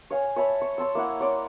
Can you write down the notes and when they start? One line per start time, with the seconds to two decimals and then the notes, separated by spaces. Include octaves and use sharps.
0.11 C#5 F5 G#5
0.36 C#5 E5 A5 B5
0.62 C#6
0.78 C#5 A5 C6 E6
0.95 A#3 E4 F#5
1.20 C#5 D5 C6